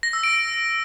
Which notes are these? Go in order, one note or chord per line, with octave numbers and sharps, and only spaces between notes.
A#6
E6
D7